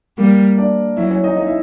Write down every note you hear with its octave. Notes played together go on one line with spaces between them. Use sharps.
G3 A#3 A#4
D4 D5
F#3 E4 E5
C#4 C#5
D#4 D#5
D#4 D#5
E4 E5